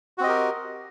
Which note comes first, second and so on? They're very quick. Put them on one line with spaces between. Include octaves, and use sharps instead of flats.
F#4 C4 D#5 G4 A#4